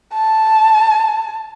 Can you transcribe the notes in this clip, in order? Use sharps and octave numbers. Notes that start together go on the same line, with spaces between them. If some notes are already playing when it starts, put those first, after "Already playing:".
A5